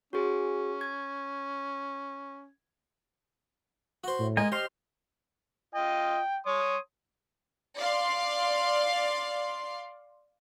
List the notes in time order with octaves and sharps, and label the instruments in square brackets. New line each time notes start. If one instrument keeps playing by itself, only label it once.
[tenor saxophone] C#4 [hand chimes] F#4 G#4
[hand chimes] G#6
[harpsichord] F#4 C5
[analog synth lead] A2
[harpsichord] G#3 [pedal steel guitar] A#4 D#5 G#5
[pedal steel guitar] G4 D#5 C6 [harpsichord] C5 [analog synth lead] F6
[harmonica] F4 D#5 [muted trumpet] G5
[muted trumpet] C#5 [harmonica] C6 D#6
[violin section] D5 F5 C6